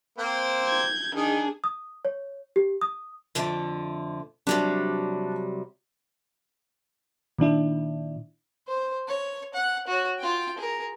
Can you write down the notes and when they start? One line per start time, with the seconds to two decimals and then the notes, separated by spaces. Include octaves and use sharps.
0.18 A#3 C4 C5
0.64 G6 G#6
1.15 D#3 D4 D#4 G#4
1.64 D#6
2.05 C#5
2.56 G4
2.81 D#6
3.35 F2 D3 A3
4.47 C3 F#3 G3 D4
7.39 A#2 D#3 D4 E4
8.68 C5
9.08 C#5
9.54 F#5
9.87 F#4 C#5
10.19 F4 G5
10.58 G#4 A#4